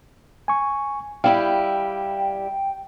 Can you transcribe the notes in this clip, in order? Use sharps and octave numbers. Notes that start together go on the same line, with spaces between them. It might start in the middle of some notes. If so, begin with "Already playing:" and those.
G#5 C#6
G3 E4 G4 F5 G5